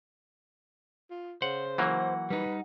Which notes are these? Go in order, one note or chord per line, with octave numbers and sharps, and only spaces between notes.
F4
C#3 C5 F#5
E3 F#3 A#3 F#5
G3 D#4 B4